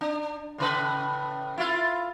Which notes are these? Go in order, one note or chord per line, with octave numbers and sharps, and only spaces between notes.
D4
A2 C#3 B4
E4 F4